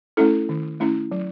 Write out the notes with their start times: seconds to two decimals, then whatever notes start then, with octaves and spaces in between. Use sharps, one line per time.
0.17 A3 C#4 E4 A4
0.49 D#3
0.80 A3 C#4 E4
1.12 F#3